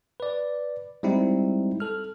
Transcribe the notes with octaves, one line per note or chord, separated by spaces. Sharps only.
B4 D5
G3 G#3 C4 D#4 E4
A4 F6